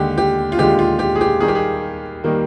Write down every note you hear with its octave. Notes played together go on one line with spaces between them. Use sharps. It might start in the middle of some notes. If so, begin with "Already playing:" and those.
Already playing: D#2 D3 G#3 G4
G4
F4
D#2 D3 G#3 G4
F4
G4
G#4
G4
D#2 D#3 G3 A#3 G#4
G4
G#4
D#3 G3 A#3